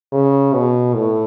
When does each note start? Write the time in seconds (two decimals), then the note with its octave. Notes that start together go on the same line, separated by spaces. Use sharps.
0.12 C#3
0.54 B2
0.94 A2